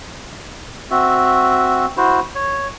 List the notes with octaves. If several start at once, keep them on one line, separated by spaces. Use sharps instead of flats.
C4 F#4 E5
E4 F#4 C5
C#5